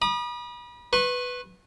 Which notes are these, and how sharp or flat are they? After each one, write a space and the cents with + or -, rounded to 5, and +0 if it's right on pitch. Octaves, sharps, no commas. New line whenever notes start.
B5 -35 D#6 -35
B4 +0 C#6 -35